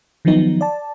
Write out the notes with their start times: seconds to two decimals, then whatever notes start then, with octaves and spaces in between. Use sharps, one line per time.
0.25 D#3 F3 F#3 B3 D#4
0.61 D5 A5